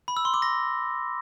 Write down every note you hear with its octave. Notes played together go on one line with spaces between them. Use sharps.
B5
E6
C6
D6
A#6